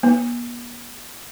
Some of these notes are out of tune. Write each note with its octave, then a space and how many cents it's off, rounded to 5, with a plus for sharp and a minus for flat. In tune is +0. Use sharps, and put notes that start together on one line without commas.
B3 -45